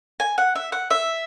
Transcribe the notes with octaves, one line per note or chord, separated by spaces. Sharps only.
G#5
F#5
E5
F#5
E5